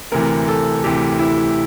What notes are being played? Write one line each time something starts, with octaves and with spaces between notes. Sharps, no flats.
D2 C3 E3 A#4
A4
D2 C3 E3 G4
E4